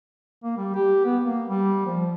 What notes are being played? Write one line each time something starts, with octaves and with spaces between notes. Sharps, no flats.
A#3
G3
G4
B3
A#3
G3
F3